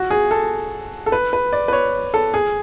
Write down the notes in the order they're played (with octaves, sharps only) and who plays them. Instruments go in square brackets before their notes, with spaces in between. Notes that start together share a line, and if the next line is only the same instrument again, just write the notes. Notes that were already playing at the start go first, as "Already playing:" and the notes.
Already playing: [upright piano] F#4
G#4
A4
A4
B4
B4
D5
B4
C#5
A4
G#4